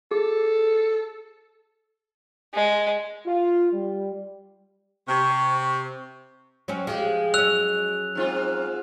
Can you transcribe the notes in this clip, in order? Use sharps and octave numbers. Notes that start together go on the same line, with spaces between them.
G#4 A4
G#3
F4
G3
C3 C#6
F#3 C4 C#4
F3 G#3 G4
F#3 C#4 E6 F#6 F7
G#2 C4 F4